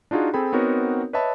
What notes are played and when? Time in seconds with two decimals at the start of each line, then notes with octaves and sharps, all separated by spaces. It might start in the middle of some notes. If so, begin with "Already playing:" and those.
0.11 D4 D#4 F4 F#4 G#4
0.34 C4 G#4 A4 G5 B5
0.53 B3 C4 D#4 F#4 A#4 C#5
1.13 B4 C#5 D#5 E5 A5 B5